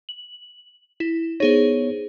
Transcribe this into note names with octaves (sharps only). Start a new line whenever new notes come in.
F#7
E4
B3 D#4 G#4 C5 C#5